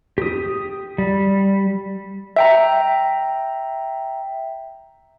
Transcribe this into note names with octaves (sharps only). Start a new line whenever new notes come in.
G4 D#6
G3
E5 G5 A#5